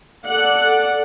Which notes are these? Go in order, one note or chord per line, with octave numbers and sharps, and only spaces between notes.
A4 D5 F#5